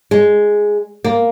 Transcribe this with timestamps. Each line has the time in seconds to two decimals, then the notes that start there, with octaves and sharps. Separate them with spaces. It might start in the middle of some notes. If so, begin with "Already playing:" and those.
0.11 G#3
1.04 A#3